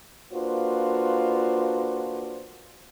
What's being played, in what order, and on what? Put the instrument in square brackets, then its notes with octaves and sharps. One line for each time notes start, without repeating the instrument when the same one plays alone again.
[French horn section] A#3 D4 F4 F#4 B4 C5